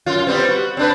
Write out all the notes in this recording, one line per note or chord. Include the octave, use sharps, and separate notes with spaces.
F#2 F4
G3 B3 C4
F#4
C4 D4 B4